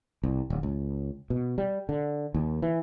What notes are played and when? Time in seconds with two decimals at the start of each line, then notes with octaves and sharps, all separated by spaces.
0.23 C2
0.50 D1
0.63 C#2
1.30 B2
1.58 G3
1.89 D3
2.34 D#2
2.62 E3